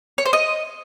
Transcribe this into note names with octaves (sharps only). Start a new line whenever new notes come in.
C#5
C5
D#5